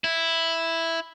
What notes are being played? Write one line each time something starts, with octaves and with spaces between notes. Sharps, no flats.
E4